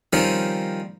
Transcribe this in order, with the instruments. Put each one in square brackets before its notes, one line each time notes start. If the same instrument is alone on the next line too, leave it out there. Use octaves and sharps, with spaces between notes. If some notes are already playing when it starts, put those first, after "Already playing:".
[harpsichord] D#3 F3 G3 C4 C#4 D#4